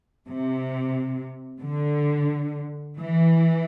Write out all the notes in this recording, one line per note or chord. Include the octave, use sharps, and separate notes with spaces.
C3
D3
E3